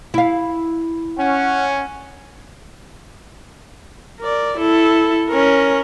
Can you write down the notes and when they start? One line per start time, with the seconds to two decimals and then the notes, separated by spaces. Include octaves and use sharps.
0.14 E4 F5
1.18 C#4 F#5
4.20 A#4 D5
4.58 E4 A4
5.30 C#4 A#4